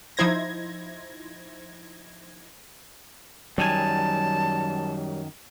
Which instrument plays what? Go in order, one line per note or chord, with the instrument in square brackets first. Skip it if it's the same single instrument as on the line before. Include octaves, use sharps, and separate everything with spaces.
[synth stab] F3 D#4 E4 C5 G#6 A#6
[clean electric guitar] F#2 D#3 G#5 [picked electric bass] F#3 G3 [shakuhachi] A5